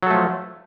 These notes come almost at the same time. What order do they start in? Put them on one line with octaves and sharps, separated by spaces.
F#3 A4 A3 F3